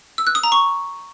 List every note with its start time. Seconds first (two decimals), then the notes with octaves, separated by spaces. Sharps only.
0.18 E6
0.27 F#6
0.35 D#6
0.43 A#5
0.52 C#6